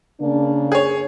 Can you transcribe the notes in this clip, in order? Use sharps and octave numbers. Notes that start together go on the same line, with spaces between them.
C#3 A#3 D4
G#4 C#5